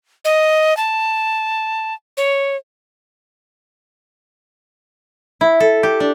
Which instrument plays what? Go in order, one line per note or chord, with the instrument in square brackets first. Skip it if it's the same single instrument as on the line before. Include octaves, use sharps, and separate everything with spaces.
[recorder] D#5
A5
C#5
[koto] E4
A4
G4
D4